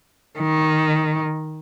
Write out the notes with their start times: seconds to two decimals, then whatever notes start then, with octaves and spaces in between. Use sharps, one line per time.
0.40 D#3